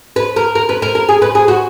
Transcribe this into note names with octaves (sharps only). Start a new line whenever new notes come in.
B4
A#4
A#4
B4
A#4
A#4
G#4
B4
G#4
F#4